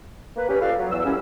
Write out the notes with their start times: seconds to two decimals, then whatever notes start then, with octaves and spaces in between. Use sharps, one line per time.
0.36 A#3 B4
0.48 C#4 G4 B4
0.60 F4 A4 B4 D5 F5
0.78 F#3
0.92 E2 E6
1.05 F#2 A2 G3 C#4